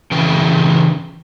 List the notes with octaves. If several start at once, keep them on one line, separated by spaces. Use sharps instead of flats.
C#3 E3 G5